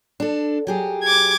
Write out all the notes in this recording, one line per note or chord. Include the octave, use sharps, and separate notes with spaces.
D4 A4
F#3 G4 G#4
D6 G#6